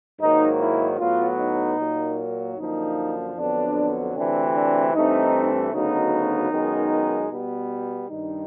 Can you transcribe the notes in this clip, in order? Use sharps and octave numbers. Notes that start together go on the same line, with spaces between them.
G#2 D#3 F#3 A#3 D#4
E4
A2 F#3 B3 F4
D#4
A#2 F#3 A#3
F#2 D3 F3 A#3 D#4
F2 D3 F#3 B3 D4
D2 C3 E3 A3 C4 D4
D4
G2 E3 A3 C4 D#4
D2 C#3 F#3 B3 D#4
F#2 D#3 G#3 B3
B2 G3 B3
G2 D#3 G3 D#4